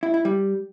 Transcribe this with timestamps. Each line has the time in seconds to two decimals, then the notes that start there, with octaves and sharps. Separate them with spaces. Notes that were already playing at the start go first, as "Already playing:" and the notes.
0.03 E4
0.14 E4
0.25 G3